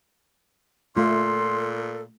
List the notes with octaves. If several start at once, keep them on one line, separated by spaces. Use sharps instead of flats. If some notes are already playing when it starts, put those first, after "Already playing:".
A#2 A3 F4 A4 C6